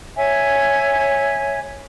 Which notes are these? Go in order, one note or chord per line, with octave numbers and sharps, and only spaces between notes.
C#5 E5 G#5